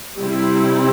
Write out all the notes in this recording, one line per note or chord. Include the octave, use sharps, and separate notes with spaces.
C3 G3 C4 E4